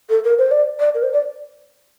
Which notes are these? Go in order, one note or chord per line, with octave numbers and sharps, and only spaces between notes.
A4
A#4
C5
D5
D5
A#4
C5
D5